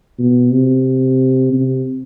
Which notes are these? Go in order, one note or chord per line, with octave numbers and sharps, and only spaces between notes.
B2
C3
C3